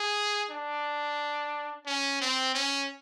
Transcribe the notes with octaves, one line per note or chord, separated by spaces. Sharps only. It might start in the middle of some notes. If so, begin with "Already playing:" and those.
Already playing: G#4
D4
C#4
C4
C#4